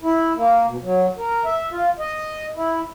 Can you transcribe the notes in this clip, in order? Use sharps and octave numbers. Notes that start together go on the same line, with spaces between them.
E4
A#3
B2
F#3
A#4
E5
F4
D#5
E4